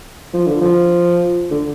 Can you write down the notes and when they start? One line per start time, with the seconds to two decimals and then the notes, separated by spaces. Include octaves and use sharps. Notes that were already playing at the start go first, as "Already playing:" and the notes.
0.33 F3
0.47 D3
0.61 F3
1.51 D3